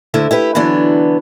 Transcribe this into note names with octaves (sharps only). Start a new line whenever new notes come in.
D2 D3 E4
E4 G4 B4
D3 E3 F#3 B3 D4